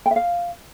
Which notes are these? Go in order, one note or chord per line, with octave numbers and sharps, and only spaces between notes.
G5
E5
F5